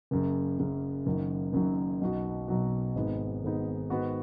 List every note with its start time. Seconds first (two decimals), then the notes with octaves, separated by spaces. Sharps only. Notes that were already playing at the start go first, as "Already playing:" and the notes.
0.11 F#1 F#2 C#3
0.59 F#1 F#2 C#3
1.06 F#1 F#2 D#3 F#3
1.53 F#1 F#2 D#3 F#3
2.01 B1 B2 F#3 D#4 F#4
2.48 B1 B2 F#3 D#4 F#4
2.95 G#1 G#2 G#3 B3 D#4
3.43 G#1 G#2 G#3 B3 D#4
3.90 G#2 D#3 B3 F#4